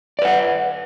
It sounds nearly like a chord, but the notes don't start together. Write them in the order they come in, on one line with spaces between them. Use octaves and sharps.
D5 B4 F#5